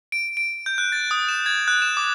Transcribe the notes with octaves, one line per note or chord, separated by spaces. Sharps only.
D7
D7
G6
F#6
A6
D#6
E7
G#6
F#6
E7
D6